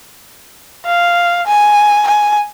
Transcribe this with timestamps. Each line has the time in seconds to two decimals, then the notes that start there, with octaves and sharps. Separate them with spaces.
0.85 F5
1.47 G#5
2.07 G#5